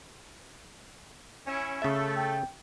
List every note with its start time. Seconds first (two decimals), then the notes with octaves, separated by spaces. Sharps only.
1.46 C#4 E4
1.82 C#3 A3 A4 E5
2.16 G5